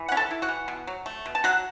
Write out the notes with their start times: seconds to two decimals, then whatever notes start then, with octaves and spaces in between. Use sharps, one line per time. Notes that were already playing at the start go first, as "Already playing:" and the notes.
Already playing: E3
0.09 F#5
0.12 C#4
0.17 A4 A5
0.31 E4
0.42 F#4 F#5
0.49 E3
0.68 B2
0.87 F#3
1.06 A3
1.26 B2
1.35 A5
1.44 F#3 F#4 F#5